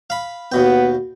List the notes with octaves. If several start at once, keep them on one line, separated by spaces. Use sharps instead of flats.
F5 B5
D#2 B2 B3 G5